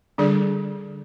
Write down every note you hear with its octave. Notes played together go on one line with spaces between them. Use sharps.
D3 G3 D4 G#4 D5